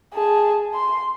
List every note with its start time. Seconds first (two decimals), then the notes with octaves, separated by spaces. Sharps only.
0.14 G#4 A5
0.74 C6